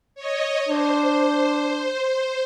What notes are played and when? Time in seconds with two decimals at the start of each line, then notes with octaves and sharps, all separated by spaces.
0.15 C#5 D#5
0.69 D4 C5